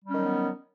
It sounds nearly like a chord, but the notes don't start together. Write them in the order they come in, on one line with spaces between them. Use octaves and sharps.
G3 C#4 D#3 F#3 B3